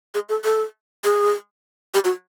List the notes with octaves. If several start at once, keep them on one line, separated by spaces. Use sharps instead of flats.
G#4
A4
A4
G#4
G4
F#4